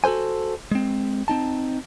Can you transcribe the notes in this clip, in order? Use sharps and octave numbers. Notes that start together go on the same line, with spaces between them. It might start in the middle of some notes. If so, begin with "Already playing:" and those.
F#4 A4 A#4 C5 G#5
G#3 C4
C4 D#4 A5